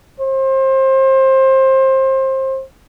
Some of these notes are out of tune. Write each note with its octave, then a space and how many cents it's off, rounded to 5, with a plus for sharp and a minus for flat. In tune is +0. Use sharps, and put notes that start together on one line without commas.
C5 +25